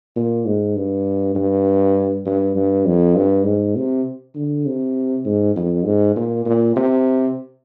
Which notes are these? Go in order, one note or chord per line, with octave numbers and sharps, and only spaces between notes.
A#2
G#2
G2
G2
G2
G2
F2
G2
G#2
C3
D3
C3
G#2
F2
G#2
A#2
A#2
C3